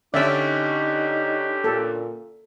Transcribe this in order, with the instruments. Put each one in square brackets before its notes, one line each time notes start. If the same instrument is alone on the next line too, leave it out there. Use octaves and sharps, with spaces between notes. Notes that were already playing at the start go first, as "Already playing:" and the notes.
[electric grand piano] D3 C#4 [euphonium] D#4 [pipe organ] G4 [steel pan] D5 E5
[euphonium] A#2 [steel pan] A4